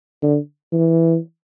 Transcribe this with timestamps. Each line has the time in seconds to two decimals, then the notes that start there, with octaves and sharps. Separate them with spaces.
0.22 D3
0.73 E3